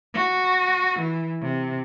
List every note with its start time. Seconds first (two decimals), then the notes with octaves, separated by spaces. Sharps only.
0.15 F#4
0.99 E3
1.42 C3